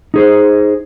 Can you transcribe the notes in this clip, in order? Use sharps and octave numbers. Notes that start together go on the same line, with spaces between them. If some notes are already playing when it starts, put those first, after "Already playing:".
D#4 G#4 C5